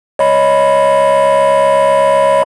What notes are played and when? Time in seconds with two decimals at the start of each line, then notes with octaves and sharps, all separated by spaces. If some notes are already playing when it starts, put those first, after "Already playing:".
0.19 C#5 D#5 B5